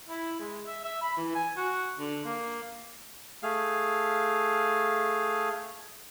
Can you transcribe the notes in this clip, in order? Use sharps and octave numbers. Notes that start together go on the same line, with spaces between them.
E4
G#3
E5
E5
B5
E3
G#5
F#4
D3
A#3
A3 G#4 F5